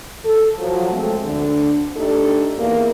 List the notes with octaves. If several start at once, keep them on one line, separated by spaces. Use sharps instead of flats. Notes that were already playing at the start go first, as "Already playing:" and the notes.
A4
F3 F#3
G#3 A3 C4 A4
D2 D3
A3 D4 D#4 G4 A4
E2 A#3